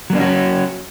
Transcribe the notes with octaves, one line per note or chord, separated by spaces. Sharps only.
F#3 A#3 C#4 D4 F#4